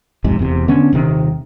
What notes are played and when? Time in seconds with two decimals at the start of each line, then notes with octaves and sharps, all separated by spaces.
0.24 B1 F2 G#2 C3
0.39 E1 E2 C3
0.68 D3 B3 C#4 D4
0.93 D#1 C3 D#3